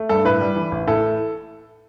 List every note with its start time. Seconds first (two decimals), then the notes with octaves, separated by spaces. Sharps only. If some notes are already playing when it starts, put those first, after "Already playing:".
Already playing: A3
0.09 G2 A4
0.25 A2 B4
0.41 G3
0.56 E3
0.71 A1
0.87 A2 A4